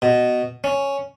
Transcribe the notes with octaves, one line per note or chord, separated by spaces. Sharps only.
B2
C#4